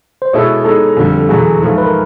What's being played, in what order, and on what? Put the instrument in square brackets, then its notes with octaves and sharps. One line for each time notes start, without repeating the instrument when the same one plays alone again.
[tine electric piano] C5
[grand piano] B2 G#3 B3 E4 A4 [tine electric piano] C#5
[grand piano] G#3 B3 D#4 [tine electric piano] A4
[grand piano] F2 D3 G3
[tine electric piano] A4
[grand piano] E2 B2 F#3 [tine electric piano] G#4
[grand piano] G#2 F3 A3
[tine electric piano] B4
A#4